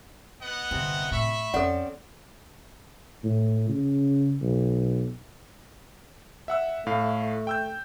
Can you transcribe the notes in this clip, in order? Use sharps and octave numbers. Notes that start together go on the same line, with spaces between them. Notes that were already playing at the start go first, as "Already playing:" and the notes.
B3 D#5 F#5
G1 G2 C3 C4 E4
A2 E5 B5 C#6
F2 C4 C#4 A4 D5 F#5
A2
C#3
B1
E5 F#5 E6
A2 A3 F5
G5 E6 G6